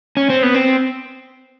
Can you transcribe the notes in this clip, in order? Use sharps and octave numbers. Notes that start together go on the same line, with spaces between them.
C#4
C4
B3
C4